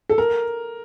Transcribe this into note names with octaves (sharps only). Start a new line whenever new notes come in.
A4
A#4